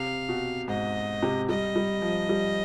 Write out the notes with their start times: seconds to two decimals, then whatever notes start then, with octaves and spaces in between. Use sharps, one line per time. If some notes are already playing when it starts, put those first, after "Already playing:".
Already playing: C3 F5
0.29 B2
0.68 G#2 D#5
1.23 C3
1.49 G3 D#5
1.76 G3
2.02 F3
2.29 G3